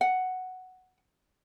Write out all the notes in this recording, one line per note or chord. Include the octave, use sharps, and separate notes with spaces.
F#5